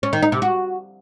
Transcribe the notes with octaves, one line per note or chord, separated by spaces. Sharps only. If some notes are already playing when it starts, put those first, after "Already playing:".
C#4
D#3
D#4
C3
F#4